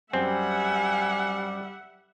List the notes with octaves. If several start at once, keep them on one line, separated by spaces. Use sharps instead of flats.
F#2 G3 C4 E5 F#5 G#5